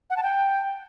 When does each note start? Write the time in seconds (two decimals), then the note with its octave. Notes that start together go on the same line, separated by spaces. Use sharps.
0.10 F#5
0.17 A5
0.23 G5